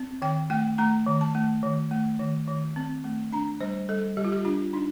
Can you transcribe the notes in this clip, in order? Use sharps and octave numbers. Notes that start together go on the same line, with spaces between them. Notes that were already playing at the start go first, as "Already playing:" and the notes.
Already playing: C4
D#3 G5
A3 G5
A3 A#5
D#3
A5
A3
D#3
A3
D#3
D#3
C4
A3
D4 A#5
G3 C5
G3 A4
G3 G4
F4
G4
D4 F4
D4 D#4